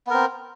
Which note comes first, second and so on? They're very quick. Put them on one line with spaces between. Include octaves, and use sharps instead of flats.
B3 A#4 C4